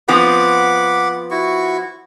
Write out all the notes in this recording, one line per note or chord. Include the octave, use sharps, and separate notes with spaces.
F3 B3 C4 F#5 B5 D6
E4 F#4 C#6